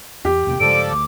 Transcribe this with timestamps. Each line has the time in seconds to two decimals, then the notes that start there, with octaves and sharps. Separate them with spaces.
0.25 E2 G4
0.47 E2 C3 A#3 G5
0.60 G2 C#3 F3 G#3 A4 D5 D7
0.91 D2 D6